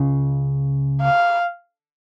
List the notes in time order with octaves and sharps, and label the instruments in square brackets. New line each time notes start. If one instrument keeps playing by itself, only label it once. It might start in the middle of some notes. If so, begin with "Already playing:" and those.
Already playing: [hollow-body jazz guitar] C#2 C#3
[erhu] F5